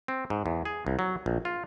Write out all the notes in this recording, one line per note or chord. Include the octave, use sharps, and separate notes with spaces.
C4
G#2
E2
G#4
C2
F#3
A#1
F4